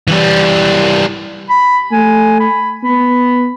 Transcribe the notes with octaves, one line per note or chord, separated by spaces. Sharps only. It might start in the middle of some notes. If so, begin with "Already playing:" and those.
E3 G3
B5
A3 G#5
B5
B3 B5